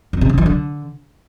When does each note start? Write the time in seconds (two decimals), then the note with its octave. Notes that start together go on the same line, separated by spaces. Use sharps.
0.13 F2
0.21 C3
0.29 C#3
0.38 E3
0.46 D3